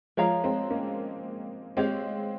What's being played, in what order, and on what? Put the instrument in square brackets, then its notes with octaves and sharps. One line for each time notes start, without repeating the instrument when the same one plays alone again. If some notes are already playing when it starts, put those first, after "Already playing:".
[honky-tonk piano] F3 G#3 [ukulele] A#4 C#5 F5 A#5
[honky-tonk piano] G#3 C4
A#3 C#4
[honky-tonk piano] G#3 C4 [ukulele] G4 C#5 F5